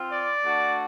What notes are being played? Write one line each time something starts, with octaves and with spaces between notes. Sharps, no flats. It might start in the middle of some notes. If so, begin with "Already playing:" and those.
Already playing: C4 F4
D5
A3 D4 F#4